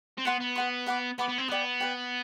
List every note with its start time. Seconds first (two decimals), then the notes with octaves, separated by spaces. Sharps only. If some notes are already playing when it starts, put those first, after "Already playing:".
0.18 C4
0.25 B3 B4 F#5 C6
0.41 B3
0.55 B4 F#5 C6
0.86 B4 F#5 B5 D6
1.18 B3 B4 F#5 B5 D6
1.28 B3
1.38 C4
1.48 B3 B4 D5 G5
1.80 B4 D5 G5